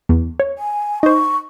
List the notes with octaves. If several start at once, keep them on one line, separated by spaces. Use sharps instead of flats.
E2
C#5
G#5
D#4 C5 C#6